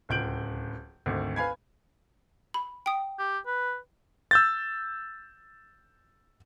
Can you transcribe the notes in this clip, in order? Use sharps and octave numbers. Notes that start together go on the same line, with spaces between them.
D1 C#2 G6 D7 F#7
G#1 D2
B4 F5 G#5 B5 G#6
B5
G5 D#6
G4
B4
E6 G6 A6